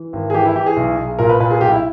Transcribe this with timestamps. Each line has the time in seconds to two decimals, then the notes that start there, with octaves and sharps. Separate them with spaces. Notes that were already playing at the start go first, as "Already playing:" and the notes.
Already playing: E3
0.13 G#1
0.30 G#4
0.34 E3 G4
0.45 E4
0.56 E3 G4
0.66 G#4
0.77 B1
0.98 B1
1.19 A#2 A#4
1.29 B4
1.40 A#2 B4
1.51 G#4
1.61 B1 G4
1.72 E4